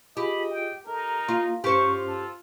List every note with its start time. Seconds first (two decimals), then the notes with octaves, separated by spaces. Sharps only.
0.17 F4 G4 G#4 D#5 B5
0.50 G5
0.87 D#4 A4 A#4
1.28 A#3 F4
1.64 G2 C#4 F4 G4 C5 C#6
2.08 A4